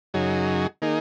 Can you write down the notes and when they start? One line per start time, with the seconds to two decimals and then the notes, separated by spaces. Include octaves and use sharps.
0.14 F#2 C#3 F#3 D#4 G#4
0.82 D#3 A#3 D#4 G#4